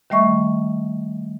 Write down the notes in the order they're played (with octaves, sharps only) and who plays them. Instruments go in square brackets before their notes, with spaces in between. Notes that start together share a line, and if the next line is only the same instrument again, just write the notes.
[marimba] D#3 G3 A3 E5 C#6